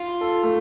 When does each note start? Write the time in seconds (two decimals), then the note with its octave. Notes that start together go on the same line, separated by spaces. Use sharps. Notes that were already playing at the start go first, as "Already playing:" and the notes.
Already playing: F4
0.21 A4
0.43 A3